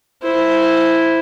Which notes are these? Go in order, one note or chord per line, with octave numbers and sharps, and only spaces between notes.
E4 C5